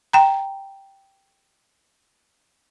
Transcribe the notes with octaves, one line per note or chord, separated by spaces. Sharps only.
G5 A#5